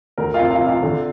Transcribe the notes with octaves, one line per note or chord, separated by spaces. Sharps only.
D2 A#4
F4 F5
C3
F4 F5
C3
F4 F5
D3